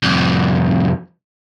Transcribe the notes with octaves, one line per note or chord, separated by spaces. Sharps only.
C2 F2